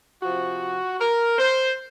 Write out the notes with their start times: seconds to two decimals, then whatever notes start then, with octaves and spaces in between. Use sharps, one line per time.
0.23 C3 F3 F#4
1.00 A#4
1.39 C5